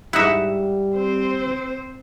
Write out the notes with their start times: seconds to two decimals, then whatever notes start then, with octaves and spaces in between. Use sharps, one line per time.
0.13 G#2 G3 D#4 E4 E5 F#5
0.97 C4 C5